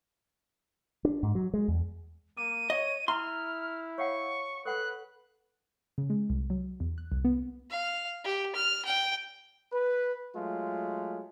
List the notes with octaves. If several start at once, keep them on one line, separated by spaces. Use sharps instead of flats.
D4
G#2
F#3
G#3
E2
A#3 D6 D#7
C#5 D#5
E4 E5 A#5 C6 F6
C#5 F5 F#5 C#6
A4 B4 F#5 C#6 F#6
C#3
G#3
C2
F#3
E2
F#6
C2
B3
F5
G4
F6
G5
B4
F#3 G#3 A3 F4